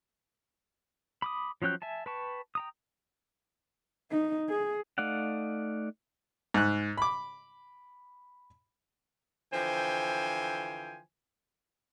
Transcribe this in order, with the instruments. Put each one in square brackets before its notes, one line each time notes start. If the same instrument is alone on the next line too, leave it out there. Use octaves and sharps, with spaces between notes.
[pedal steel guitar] B5 D6 D#6
F3 F#3 C#4 G5 F#6
E5 G#5 A5
B4 G5 A5 C#6
G5 A#5 D#6
[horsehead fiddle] D#4
G#4
[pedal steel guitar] A3 D#4 D5 F5 F#5
[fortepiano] G#2 F#6
B5 D6
[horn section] D3 E3 F3 C5 G5 G#5